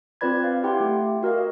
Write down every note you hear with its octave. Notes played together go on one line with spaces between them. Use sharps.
C4 F4 B4 D5 B5 G#6
F5
E4 G4 F#5 G5 C6
A3 G4
F#4 A#4 D#5 F5
D#5